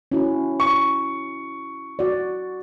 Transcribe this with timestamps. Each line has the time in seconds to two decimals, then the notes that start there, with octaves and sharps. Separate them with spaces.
0.12 C#4 E4 F#4
0.60 C#6
1.99 F#4 D5